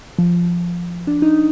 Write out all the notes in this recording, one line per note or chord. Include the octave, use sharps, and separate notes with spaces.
F3
D4
D#4